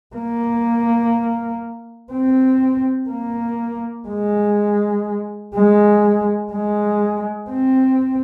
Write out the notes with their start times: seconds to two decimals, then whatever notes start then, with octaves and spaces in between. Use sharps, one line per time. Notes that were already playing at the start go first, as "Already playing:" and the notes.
0.16 A#3
2.12 C4
3.10 A#3
4.08 G#3
5.55 G#3
6.52 G#3
7.51 C4